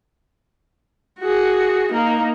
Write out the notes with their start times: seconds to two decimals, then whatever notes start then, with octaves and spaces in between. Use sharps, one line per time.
1.19 F#4 G#4
1.92 A#3 D#4